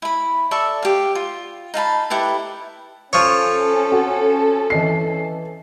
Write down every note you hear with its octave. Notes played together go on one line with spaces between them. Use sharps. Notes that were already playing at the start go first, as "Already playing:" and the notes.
E4 B5
A4 D5 E5 C#6
G4 F5
F4
D#4 F5 A5 B5
E4 G4 A4 B4
F3 C#4 A4 C#5
F#4
E3 D#5 C7